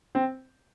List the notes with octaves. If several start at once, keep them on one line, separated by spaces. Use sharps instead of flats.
C4